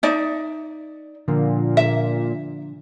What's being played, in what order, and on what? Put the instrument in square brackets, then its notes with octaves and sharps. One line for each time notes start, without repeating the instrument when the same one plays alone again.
[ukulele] D#4 D5 E5
[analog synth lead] A#2 [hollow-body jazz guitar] D3 F3
[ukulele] E5